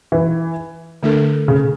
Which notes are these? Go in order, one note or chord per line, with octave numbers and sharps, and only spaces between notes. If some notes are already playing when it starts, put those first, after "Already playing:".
E3
D3 A3 D4 A4
C#3